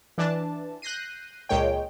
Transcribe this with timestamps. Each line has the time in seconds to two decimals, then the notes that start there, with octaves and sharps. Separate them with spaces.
0.18 E3 D4 A5
0.82 F#6 G6 A#6 C7 D#7
1.49 C#2 A#2 G#3 C#5 G5